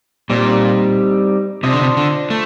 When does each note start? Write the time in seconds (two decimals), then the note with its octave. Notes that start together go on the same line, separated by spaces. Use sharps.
0.30 A#2 G3 C4 D#4 G4
1.63 C3 D4 F4 C5 D#5
1.72 D3
1.81 C3
1.97 D3
2.30 A3